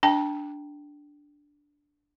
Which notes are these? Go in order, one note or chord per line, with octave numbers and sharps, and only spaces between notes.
D4 G5 A5